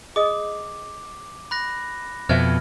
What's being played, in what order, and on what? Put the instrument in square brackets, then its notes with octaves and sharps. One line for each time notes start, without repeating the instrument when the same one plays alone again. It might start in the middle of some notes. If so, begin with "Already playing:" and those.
[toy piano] G#4 D#5 D#6 [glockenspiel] D6
[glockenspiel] B5 F#6 A#6
[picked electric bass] F2 B2 [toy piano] C5 E5 F5 [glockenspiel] F6 G#6